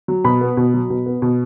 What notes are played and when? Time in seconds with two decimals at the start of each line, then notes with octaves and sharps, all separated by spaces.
0.08 F#3
0.25 B2 B5
0.41 B3
0.57 B2
0.74 F#3
0.90 B2
1.06 B3
1.22 B2